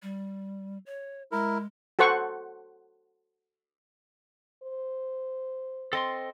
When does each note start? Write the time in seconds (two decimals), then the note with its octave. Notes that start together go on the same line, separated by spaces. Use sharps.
0.03 G3
0.86 C#5
1.32 G#3 E4 A#4
1.99 F#4 A4 C5 F#5 C#6
4.63 C5
5.93 C4 A4 D#5 C6